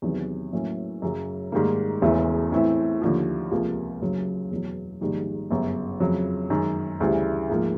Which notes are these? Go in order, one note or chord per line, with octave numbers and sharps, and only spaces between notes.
E2 C3 D#3 F#3
A2 F#3 A#3 C#4
F#2 C#3 F#3
G#2 D#3 G3 A#3
E1 E2 C#3 E3 A3
A2 E3 A3 C4 E4
D#2 D3 F3
C#2 C3 F3 A#3
F#1 F#2 C#3 F#3
E2 B2 F#3
A#1 G#2 D#3 G3
G1 F#2 C#3
F2 C#3 F#3
F#2 D#3 G#3
D2 C#3 E3 G3
G#2 F3 A#3